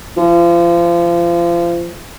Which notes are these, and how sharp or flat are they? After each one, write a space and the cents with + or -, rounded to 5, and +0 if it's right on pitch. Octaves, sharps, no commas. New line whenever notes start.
F3 -30